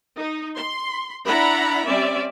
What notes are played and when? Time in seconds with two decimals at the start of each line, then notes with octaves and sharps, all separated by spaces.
0.19 D#4
0.56 C6
1.26 D4 E4 F#5 A#5 B5
1.85 G3 C4 C#4 D5 E5